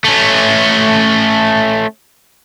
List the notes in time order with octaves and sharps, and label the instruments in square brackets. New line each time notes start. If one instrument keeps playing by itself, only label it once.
[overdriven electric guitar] A3 C#4